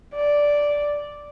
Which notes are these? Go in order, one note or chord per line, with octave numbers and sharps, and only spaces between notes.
D5